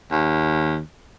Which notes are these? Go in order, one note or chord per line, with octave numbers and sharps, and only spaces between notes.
D#2